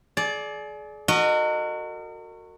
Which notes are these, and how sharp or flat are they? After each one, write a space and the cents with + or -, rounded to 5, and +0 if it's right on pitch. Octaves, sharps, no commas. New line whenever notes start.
G#4 +35 D5 -5
F#4 -10 A#4 -40 D#5 -20